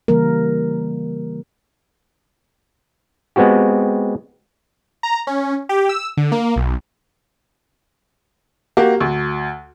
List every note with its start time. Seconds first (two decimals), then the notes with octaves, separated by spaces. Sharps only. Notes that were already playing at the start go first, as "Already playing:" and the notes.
0.08 C#3 E3 G3 A#3 A#4
3.36 G#3 B3 C4 F#4 G4
5.03 A#5
5.27 C#4
5.69 G4
5.89 E6
6.17 D3
6.32 A#3
6.56 B1
8.77 A#3 F#4 G4
9.00 D2